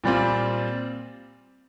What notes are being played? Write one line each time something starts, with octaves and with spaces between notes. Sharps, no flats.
A#2 G3 C4 F4